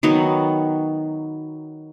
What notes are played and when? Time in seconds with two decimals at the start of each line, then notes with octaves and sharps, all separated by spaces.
0.03 D#3 F#3 B3 F#4